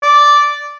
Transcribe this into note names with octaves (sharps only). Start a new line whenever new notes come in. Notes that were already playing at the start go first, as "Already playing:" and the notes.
D5